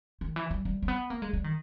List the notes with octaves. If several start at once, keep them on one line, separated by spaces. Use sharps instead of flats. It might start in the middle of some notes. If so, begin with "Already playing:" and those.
D#3
E3
G3
G3
A#3
B3
A#3
G#3
G3
D#3